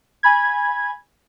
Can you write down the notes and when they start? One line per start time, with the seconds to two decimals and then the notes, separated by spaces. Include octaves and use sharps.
0.23 G#5 B5 G#6